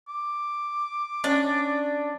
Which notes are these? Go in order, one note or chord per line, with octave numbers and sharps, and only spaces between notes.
D6
C#4 D4